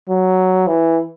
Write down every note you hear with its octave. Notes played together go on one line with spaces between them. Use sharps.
F#3
E3